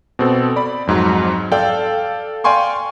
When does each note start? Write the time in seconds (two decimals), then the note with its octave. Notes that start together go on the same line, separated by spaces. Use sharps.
0.19 B2 C4 A4
0.56 D5 B5
0.87 F2 G#2 F#3
1.52 A4 D5 F5 G5
2.44 D5 F5 G5 G#5 C6 C#6